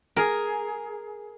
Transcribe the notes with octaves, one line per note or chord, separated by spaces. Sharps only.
G#4 A#4